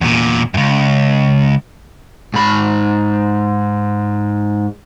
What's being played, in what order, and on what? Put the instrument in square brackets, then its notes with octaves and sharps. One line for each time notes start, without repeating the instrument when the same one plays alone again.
[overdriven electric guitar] E2 A#2
C#2 F#2
G#2 B5